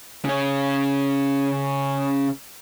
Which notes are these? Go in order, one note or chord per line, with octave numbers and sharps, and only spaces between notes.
C#3 C#4